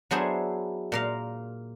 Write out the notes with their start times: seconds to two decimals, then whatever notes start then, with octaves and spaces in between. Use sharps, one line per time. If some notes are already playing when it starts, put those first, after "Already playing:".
0.11 F#3 B3 D4 E4 G#4 C5
0.92 A#2 A#4 F5